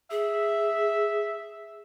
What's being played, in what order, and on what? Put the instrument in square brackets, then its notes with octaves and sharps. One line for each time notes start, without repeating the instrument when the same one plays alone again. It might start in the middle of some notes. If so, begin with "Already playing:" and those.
[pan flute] G#4 [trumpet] E5